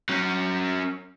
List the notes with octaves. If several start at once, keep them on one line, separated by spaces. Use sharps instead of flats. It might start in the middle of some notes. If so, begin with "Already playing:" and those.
F#3 C#4